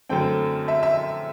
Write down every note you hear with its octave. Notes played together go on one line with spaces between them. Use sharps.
F#2 D3 A3 C4 G5
E5
E5